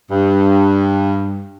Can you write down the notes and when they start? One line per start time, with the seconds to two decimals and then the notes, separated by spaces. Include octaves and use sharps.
0.10 G2